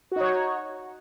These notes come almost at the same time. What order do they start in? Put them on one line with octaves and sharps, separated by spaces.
F#4 D#4 C#5